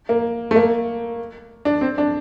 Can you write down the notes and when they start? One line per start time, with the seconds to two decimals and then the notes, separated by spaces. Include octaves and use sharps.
0.09 A#3
0.51 A3
0.56 A#3
1.65 D4
1.81 C4
1.98 D4